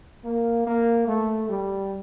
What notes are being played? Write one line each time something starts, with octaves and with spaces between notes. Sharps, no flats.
A#3
A#3
A3
G3